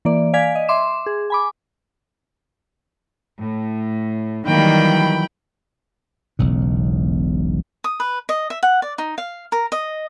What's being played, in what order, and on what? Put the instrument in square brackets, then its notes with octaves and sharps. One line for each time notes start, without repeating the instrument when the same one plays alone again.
[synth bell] E3 A#3 D5
D5 F5 G#5 G#6 B6
D#5
E5 C6 D6 E7
G#4
G#5 B5 D6
[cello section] A2
[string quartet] D#3 [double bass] E3 F#3 [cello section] G3 A#3 [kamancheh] G5 B5
[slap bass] E1 B1 C#3
[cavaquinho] D#6
B4
D#5
E5
F#5
D5
D#4
F5
A#4
D#5